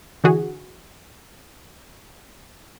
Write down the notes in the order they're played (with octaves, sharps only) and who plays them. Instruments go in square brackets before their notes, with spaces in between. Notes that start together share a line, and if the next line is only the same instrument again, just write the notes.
[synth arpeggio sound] D3 E3 F#4 G#4